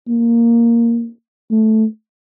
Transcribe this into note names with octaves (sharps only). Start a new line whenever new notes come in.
A#3
A3